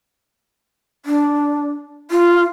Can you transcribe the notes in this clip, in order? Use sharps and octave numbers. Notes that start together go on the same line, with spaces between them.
D4
F4